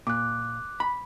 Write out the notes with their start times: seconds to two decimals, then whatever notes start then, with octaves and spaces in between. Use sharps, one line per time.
0.07 A#2 D6 F#6
0.80 B5